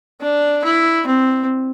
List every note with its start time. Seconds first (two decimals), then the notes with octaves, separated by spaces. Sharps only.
0.21 D4
0.64 E4
1.07 C4